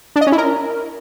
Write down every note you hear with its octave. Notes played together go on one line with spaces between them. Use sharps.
D4
D#5
C#4
E4
A#4